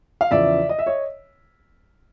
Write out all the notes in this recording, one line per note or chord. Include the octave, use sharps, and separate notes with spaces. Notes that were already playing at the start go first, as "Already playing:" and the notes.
F5
E2 C#3 F3 D5 E5
D#5
E5
C#5 D#5